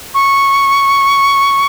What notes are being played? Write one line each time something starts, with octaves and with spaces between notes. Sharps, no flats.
C#6